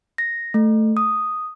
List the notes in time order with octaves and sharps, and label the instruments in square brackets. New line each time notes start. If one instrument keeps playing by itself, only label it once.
[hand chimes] A#6
A3
D#6